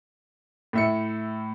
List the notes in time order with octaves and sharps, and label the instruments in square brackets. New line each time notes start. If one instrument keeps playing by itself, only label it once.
[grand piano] A2 E5 C#7